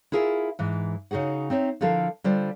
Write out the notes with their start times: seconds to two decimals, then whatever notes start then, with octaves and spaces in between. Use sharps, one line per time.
0.12 E4 F4 G#4 A#4 E5
0.59 G#2 E3
1.11 C#3 D#4 F#4 G#4 F#5
1.50 C4 D#4 C#5 E5
1.81 D3 F3 E4 A4 A#4 F5
2.24 D3 G3 F4 C5